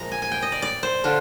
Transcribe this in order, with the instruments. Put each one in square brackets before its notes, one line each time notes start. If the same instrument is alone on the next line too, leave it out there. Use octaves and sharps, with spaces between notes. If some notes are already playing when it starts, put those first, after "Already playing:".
Already playing: [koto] A#2 F3 G#3 A#5
G#5
G#5
G5
D#5
D5
D5
C5
D3 D4 F4